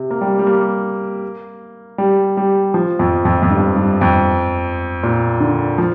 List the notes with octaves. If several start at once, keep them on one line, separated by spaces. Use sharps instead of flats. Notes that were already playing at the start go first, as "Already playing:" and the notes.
Already playing: C3
A#3
G3
G3
A#3
G3
G3
F3
F2
F2
F2
G2
G2
F2
A#2
D3
F3